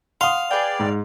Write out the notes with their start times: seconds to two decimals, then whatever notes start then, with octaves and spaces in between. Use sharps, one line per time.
0.21 F5 F#5 C6 D#6
0.51 G#4 B4 D5 G5
0.79 G#2